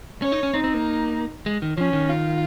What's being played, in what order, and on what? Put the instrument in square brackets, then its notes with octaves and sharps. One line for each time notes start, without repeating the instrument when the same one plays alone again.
[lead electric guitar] C#4 [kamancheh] C#5
[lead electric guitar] D#4
C#4
[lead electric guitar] C4 [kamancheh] D#4
[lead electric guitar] C4
A#3
G#3
D#3
[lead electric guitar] F3 [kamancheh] C#4
[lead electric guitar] D#3
[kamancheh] F4